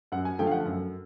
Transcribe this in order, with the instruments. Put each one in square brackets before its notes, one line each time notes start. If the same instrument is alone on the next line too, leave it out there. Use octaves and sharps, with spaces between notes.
[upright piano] F#2 F#5
G#5
D3 F3 A3 G5
F5
F#5
F#2